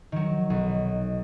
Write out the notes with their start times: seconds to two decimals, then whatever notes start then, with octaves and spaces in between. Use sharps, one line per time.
0.12 D#3 F#3
0.50 B1